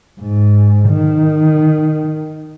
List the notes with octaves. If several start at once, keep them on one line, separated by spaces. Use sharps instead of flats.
G#2
D#3